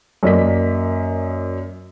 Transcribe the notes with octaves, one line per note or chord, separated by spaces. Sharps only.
F#2 A#3 D5 D#5 B6